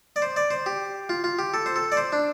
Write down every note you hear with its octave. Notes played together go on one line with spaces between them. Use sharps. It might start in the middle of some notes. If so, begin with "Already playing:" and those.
D5
C5
D5
C5
G4
F4
F4
G4
A4
C5
A4
D5
C5
D4